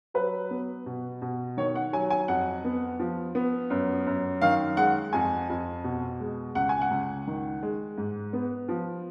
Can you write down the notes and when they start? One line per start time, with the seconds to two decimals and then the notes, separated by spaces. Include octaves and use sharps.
0.14 F#3 B4
0.51 B3
0.86 B2
1.22 B2
1.57 D#3 C#5
1.75 F#5
1.93 F#3 G#5
2.10 G#5
2.28 F2 F#5
2.64 B3
2.99 F3
3.35 B3
3.70 F#2
4.07 F#2
4.41 D#3 F5
4.77 G#3 F#5
5.13 F2 G#5
5.49 F2
5.84 B2
6.20 G#3
6.55 C#2 F#5
6.69 G#5
6.81 F#5
6.91 C#2
7.27 D#3
7.63 G#3
7.98 G#2
8.33 B3
8.69 F3